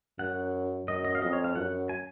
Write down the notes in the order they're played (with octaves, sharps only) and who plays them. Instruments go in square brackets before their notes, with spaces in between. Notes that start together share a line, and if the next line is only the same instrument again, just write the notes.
[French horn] F#2 [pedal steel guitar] F#5
[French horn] F#2 [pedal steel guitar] D#5
[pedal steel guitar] D#5
F5
[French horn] F2 [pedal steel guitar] D#5
[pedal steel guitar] C#5
F5
[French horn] F#2 [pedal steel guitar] F#5
[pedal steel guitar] G#5